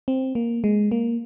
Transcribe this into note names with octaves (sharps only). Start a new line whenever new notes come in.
C4
A#3
G#3
A#3